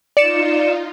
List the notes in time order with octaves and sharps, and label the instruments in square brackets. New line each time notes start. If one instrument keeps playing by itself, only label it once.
[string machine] D#4 F4 [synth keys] D5 C#7 E7